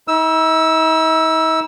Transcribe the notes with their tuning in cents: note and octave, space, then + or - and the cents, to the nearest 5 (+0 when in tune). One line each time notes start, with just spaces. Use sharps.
D#4 +45 E6 +0